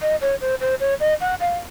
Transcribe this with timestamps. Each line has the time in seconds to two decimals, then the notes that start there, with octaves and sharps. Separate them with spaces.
0.02 D#5
0.21 C#5
0.41 C5
0.60 C5
0.80 C#5
1.00 D#5
1.20 F#5
1.40 F5